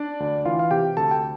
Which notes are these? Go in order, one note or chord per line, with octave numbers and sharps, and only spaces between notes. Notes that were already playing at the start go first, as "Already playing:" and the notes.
Already playing: D4 D5
D2
E3 F4 F5
F5
C3 G4 G5
D2 A4 A5
G5